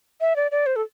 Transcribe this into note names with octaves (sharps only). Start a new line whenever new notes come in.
E5
D5
D5
C5
A4